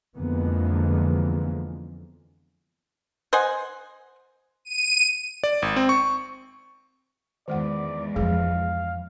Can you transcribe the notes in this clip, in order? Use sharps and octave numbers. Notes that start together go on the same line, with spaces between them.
F2 D3 E3 G#3 A#3 B3
C5 D#5 F#5 G#5
D#7
D5
G#1
C4
C#6
E2 G#2 D#3 G#3 D5 F#5
F2 F3 G#4 F5